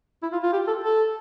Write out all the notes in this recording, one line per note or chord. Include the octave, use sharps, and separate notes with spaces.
E4
F4
F4
G4
A4
A4